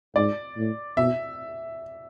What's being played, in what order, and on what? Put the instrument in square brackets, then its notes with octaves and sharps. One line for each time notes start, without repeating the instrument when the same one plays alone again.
[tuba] G#2 [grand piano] D5
[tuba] A2
[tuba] B2 [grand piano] E5